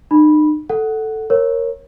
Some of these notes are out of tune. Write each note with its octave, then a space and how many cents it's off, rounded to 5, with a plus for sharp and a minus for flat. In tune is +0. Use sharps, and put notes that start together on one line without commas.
D#4 -40 B5 -10
A4 +0 F#5 +5
A#4 +0 C#5 -20